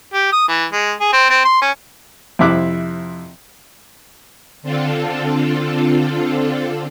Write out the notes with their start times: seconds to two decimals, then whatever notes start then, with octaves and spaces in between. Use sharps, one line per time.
0.14 G4
0.32 D#6
0.48 E3
0.72 G#3
1.01 G#4
1.13 C4
1.30 C4
1.45 C6
1.62 C#4
2.39 F2 C3 E4 E5 D6 F#6
4.62 D3 C4 D4 F4 A4